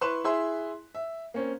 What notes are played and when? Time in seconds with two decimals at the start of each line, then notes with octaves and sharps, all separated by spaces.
0.01 E4 B4 C6 C#6 F#6 E7
0.24 E4 G#4 E5 C6
0.95 E5
1.34 A#3 C4 C#4